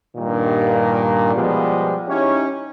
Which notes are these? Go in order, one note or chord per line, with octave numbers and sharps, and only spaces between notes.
G2 A#2 D#3
B2 F3 G3 G#3 B3
C#4 D#4 E4 G4 C#5